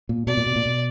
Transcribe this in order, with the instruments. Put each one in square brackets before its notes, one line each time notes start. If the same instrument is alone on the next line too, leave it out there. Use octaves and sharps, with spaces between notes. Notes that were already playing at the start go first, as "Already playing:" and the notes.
[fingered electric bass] A#2
[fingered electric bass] B2 [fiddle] D5
[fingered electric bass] A#2
B2
A#2
B2